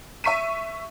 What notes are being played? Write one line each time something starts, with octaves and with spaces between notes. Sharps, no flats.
E5 C#6 B6 D#7